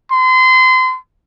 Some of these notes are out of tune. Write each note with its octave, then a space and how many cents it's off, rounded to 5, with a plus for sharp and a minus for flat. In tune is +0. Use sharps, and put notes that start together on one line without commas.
C6 -30